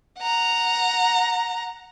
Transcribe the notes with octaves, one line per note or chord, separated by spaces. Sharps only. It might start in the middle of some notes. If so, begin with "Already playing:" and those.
F#5 A#5